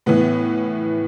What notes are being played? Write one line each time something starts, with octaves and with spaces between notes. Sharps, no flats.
A2 E3 B3